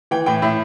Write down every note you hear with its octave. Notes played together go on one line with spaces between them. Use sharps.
E3 G5
A2 G5
A2 E5